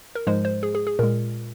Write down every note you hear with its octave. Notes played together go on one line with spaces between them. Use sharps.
A#4
G#2 F3 G#3 C5
C5
G#4
G#4
G#4
A#2 G#3 A#4